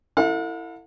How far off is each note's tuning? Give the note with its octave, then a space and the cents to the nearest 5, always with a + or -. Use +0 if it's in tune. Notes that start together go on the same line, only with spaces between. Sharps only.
E4 +5 A4 +40 F#5 -45